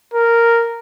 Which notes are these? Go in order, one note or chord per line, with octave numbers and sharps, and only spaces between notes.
A#4